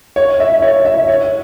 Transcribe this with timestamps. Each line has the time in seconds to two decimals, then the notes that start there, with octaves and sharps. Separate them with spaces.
0.16 C#5
0.40 E5
0.62 C#5
0.85 E5
1.08 C#5